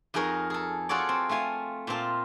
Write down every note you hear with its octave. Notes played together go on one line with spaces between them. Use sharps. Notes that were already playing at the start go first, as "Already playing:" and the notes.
F2 D#4 G#4 A#4 C#5
G#4 A4
F4 F#4 G#4 A4 C#5 D5
C4
A3 F4 F5 G#5
A#2 C4 F4 A5